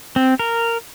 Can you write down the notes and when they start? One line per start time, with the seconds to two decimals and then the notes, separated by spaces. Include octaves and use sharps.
0.16 C4
0.39 A#4